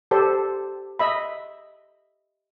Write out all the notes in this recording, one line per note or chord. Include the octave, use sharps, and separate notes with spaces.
G4 A4 C5 D5
D#5 E5 B5